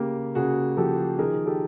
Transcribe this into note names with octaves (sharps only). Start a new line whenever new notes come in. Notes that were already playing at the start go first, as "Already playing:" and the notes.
Already playing: C#3 A#3 G4
C#3 F#4 G#4
F3 G4 A4
D#3 G#4 A#4
G4 A4